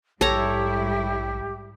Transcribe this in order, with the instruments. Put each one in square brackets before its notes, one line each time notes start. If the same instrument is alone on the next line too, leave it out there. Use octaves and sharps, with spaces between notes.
[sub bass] A#1 [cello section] G#2 G3 E4 [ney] G4 [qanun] A4 C#5 A#5